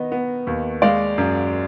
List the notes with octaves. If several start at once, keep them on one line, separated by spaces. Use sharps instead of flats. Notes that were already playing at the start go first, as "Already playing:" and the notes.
Already playing: D#3 B3 D#5
B3
D#2
G#3 D5 F5
F#2